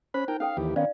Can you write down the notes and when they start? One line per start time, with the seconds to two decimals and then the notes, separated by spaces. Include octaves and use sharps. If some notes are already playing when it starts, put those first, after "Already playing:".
0.14 C#4 C5 B5
0.28 D#4 A#4 G5
0.40 C#4 A4 F5 G5
0.57 D#2 E3 G4
0.76 D#3 B3 C#4 D5 F5